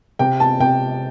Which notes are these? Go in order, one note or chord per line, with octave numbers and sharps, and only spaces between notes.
C3 G5
A5
C3 G5